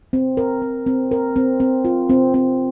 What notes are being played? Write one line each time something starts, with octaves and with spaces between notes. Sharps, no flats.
C4
A#4
C4
C4
A#4
C4
C4
F4
C4
C4